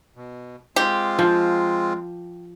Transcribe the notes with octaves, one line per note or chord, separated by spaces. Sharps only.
B2
G#3 C4 F4 G4
F3